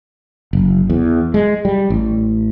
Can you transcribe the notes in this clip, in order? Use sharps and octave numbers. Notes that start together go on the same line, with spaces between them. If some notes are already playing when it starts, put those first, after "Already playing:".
F#1
E2
G#3
G3
A1